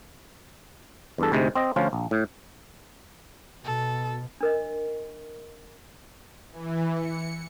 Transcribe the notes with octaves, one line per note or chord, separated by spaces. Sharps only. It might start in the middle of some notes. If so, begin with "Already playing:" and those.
E2 G2 A4
D2 G#2 C3 G#3
C4 D#5
D2 F3 C#4 F4
A#1
A2
B2 A4
D4 A#4 D#5
E3
C#7